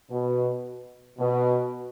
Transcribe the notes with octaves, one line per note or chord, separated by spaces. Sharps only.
B2
B2